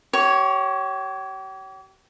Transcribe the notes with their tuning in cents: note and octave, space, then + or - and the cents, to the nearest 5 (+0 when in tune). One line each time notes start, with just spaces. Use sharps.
G4 -40 C#5 +0